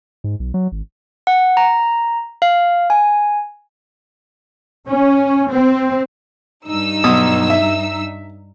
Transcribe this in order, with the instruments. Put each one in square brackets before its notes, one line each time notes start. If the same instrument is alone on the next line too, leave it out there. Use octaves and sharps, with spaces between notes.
[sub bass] G#2
B1
F#3
G#1
[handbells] F#5
A#5
F5
G#5
[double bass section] C#4
C4
[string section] G2 D#4 E6
[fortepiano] B1 D#6
E5